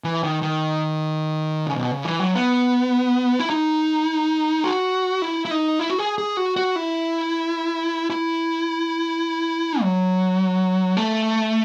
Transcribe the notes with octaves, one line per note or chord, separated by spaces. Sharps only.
E3
D#3
D#3
C#3
B2
C#3
E3
F#3
B3
E4
D#4
F#4
E4
E4
D#4
E4
F#4
G#4
G#4
F#4
F#4
E4
E4
F#3
A3